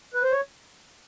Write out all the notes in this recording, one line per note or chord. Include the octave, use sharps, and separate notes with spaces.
B4
C5
C#5